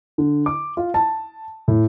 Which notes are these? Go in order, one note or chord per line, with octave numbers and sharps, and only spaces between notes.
D3
D6
F4
A5
A2